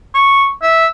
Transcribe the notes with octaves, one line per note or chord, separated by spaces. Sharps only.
C#6
E5